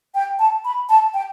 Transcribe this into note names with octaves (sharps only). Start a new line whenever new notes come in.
G5
A5
B5
A5
G5